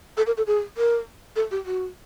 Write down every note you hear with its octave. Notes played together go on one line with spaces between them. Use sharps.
A4
A#4
A4
G#4
A#4
A4
G4
F#4